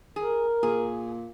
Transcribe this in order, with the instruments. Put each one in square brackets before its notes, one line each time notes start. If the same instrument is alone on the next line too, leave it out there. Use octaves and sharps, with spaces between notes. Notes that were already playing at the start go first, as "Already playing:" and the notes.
[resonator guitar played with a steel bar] G#4 [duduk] A#4
[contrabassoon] A#2 [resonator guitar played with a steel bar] G#4